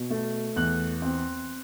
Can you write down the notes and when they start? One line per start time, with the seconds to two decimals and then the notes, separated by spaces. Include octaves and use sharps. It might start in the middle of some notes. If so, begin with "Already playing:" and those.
Already playing: B2
0.10 A3
0.56 E2 F#6
1.02 C4